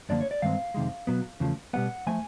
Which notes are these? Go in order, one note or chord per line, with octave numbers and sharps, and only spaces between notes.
F#2 D3 F3 A#3 D5
C#5
D5
G2 D#3 G#3 C4 F5
F2 C3 D#3 G#3
B2 F#3 B3
E2 C#3 F3 A3
B2 G3 B3 F#5
F3 A3 G#5